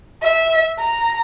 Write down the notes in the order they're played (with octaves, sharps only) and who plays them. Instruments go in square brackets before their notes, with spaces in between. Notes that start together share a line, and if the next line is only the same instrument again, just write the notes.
[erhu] E5
A#5